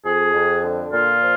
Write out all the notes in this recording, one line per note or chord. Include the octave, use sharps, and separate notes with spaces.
F2 G#4
F2
D3
A#2 F4
F3